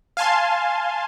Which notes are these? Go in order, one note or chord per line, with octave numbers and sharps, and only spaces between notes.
F5 G#5 A5 C6